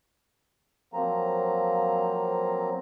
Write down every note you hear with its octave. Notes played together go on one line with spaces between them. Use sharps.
F3 F#3 A#3 C4 A#5